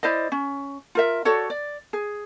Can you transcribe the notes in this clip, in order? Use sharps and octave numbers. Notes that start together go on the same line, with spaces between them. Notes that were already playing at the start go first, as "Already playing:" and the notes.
E4 C5 D5 D#5
C#4
F4 A#4 E5
F#4 A4 C#5 D5
D5
G#4